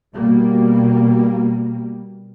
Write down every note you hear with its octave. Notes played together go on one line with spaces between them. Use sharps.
B2 G3 A#3